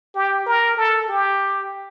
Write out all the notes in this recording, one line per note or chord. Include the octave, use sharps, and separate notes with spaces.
G4
A#4
A4
G4